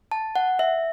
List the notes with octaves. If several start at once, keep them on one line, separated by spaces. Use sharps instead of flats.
A5
F#5
E5